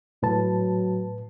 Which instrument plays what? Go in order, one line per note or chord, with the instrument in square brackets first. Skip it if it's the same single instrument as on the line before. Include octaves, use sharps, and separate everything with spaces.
[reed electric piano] A2 B4 A5 [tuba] F#3